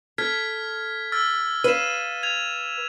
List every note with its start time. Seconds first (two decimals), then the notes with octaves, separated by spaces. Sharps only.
0.18 A4 F6 G#6 B6
1.12 E6 F6 A6
1.64 B4 F5 D#7 E7
2.23 G#6 F7